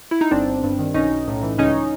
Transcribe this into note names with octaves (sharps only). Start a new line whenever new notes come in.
E4
D#4
G1 C4 D4
G1
G2
D#3
B1 C#4 D#4
B1
A2
E3
C#2 C#4 D#4